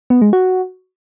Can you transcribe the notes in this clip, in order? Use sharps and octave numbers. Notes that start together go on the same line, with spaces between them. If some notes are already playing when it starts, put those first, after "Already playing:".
B3
G#3
F#4